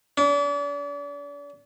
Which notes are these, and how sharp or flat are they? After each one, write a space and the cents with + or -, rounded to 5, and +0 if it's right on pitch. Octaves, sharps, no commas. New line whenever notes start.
D4 -40